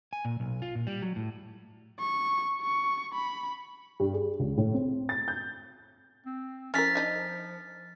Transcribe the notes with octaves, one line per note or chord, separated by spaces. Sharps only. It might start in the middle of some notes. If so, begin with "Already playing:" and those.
G#5
A#2
B1
F4
A#2
G3
F#3
A2
C#6
C#6
B5
G2
G#4
C#2
A2
C4
A6
G6
C4
F3 C#4 E4 A#4 F6 A6 B6
D4 D#4 D#5